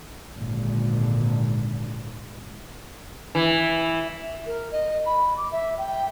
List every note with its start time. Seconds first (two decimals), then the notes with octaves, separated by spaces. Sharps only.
0.33 G#1 A#2 D3
3.35 E3
4.47 A#4
4.72 D#5
5.06 B5
5.37 D6
5.52 E5
5.78 G5